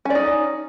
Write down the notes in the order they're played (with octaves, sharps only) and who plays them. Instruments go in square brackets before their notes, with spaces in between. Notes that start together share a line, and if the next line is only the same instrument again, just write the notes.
[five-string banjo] C#4
D5
D#4